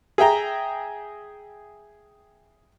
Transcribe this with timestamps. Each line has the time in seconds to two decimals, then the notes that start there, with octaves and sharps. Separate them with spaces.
0.18 G#4 E5 G5 A#5